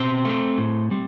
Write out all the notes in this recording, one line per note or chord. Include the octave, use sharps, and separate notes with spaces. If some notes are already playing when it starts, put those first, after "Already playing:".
Already playing: B2 C4 C5
A3 C4
A2
G3 C4